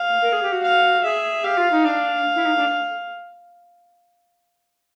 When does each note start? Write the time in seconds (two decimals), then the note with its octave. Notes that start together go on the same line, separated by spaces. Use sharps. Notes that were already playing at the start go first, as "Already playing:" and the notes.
Already playing: F5
0.22 A#4
0.32 G#4
0.42 G4
0.52 F#4
0.63 F5
1.04 G#4 E5
1.44 G4 F5
1.57 F4
1.71 D#4
1.85 D4 F5
2.36 E4
2.45 D#4
2.56 D4